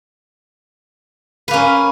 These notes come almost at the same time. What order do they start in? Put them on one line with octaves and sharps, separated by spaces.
B4 A#3 C#4